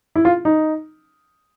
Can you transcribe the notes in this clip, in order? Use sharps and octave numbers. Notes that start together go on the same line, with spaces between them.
E4
F4
D#4